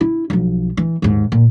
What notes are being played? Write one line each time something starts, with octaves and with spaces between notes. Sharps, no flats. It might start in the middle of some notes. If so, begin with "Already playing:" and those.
E4
B1 F3
E3
D#2 G#2
A#2